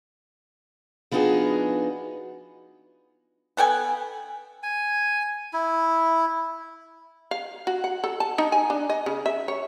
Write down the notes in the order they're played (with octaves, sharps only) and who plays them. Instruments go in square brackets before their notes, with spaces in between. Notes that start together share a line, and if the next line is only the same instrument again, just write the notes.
[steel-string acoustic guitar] F3 B3 D4 D#4 F#4 G#4
[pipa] B3 A4 G5 G#5
[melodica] G#5
E4
[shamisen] F5
F#4
F#5
A4
A5
D#4
G#5
D4
D#5
C#3
E5
C#5